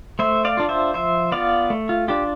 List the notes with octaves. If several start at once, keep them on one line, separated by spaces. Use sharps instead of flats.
A3 C5 E5
D5 F5
D4 F4
C5 E5
F3 C5 E5
B3 F4 D5 F5
A3
F4
D4 F4 G4